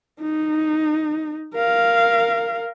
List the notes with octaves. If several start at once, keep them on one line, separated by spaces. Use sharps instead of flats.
D#4
A#4 F5